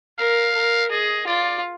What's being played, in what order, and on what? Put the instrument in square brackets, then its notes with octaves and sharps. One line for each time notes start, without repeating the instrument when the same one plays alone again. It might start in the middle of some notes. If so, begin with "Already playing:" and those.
[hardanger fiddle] A#4 [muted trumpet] F5
[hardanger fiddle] A#4
[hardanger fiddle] G#4 [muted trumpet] D#5
[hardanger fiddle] F4 [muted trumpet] D5